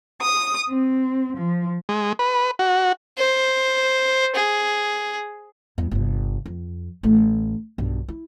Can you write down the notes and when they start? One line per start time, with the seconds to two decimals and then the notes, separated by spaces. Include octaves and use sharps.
0.20 D#6
0.69 C4
1.37 F3
1.89 G#3
2.19 B4
2.59 F#4
3.18 C5
4.35 G#4
5.78 E2 G3
5.91 G1 C3
6.46 F2
7.03 A1 A3
7.78 B1 G2
8.08 E4